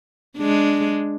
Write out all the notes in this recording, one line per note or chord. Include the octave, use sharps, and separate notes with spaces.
G#3 D4